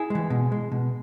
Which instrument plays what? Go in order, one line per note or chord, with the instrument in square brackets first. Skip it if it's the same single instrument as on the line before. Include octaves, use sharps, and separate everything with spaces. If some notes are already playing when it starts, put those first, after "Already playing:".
Already playing: [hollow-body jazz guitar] E4 G#4
E3 G#3
B2
G#3
B2